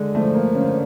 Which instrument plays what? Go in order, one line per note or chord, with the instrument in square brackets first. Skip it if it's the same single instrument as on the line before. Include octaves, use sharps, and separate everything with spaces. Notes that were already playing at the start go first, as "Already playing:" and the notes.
Already playing: [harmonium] D3 [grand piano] G#3
[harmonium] F3 [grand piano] A3
[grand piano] A#3
[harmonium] D3 [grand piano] C#4